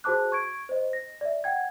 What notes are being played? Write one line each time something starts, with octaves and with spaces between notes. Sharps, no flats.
F#4 G#4 C5 A5 D6 F#6
C#6 G#6 D7
C5 D#5
A#6
D5 E5
F#5 G5 G#6